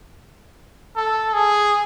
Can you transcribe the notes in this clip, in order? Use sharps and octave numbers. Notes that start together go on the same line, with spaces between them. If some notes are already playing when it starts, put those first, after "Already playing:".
A4
G#4